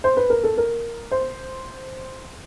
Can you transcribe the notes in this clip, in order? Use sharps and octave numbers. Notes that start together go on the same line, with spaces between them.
C5
B4
A#4
A4
A#4
C5